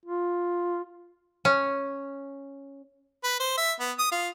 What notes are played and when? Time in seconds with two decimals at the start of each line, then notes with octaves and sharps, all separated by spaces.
0.06 F4
1.45 C#4
3.24 B4
3.40 C5
3.58 E5
3.80 B3
3.99 D#6
4.12 F4